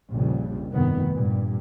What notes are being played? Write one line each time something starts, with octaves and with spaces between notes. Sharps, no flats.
A#1 F2 C#3 G3
F1 G2 D#3 B3
G2 A#2